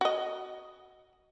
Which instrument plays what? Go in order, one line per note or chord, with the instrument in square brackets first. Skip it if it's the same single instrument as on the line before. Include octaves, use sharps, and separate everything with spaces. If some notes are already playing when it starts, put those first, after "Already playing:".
[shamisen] F#4 D#5